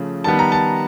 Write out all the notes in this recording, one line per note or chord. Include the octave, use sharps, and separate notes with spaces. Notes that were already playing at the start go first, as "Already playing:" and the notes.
Already playing: C#3 F3 A3
D#3 G3 B3 A5
A#5
A5